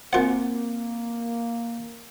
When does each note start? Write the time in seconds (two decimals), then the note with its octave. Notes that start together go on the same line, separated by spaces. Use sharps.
0.13 A#3 C4 F4 A#4 C5 F#5